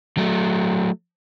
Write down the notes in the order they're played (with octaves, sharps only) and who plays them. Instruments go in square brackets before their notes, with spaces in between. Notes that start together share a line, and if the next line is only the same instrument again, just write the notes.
[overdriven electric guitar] F#3 A3